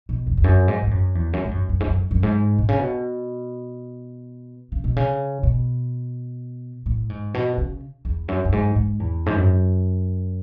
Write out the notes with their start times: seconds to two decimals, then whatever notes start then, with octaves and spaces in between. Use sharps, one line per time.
0.09 B2
0.27 E2
0.37 E2
0.44 F#2
0.68 G#2
0.83 G#2
0.91 F#2
1.15 E2
1.33 F#2
1.44 G#2
1.51 F#2
1.69 F#2
1.80 G#2
1.86 F#2
2.11 F#2
2.23 G#2
2.58 B2
2.69 C#3
2.79 B2
4.72 C#3
4.84 B2
4.97 C#3
5.43 B2
6.86 A2
7.10 G#2
7.34 B2
7.58 C#3
8.05 E2
8.28 F#2
8.45 F#2
8.52 G#2
8.76 G#2
9.00 E2
9.26 G#2
9.36 F#2